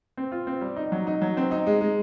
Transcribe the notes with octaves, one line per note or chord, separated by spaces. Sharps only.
C4
F4
C4
G3
D#4
F#3
D#4
F#3
C4
D#4
G#3
G#3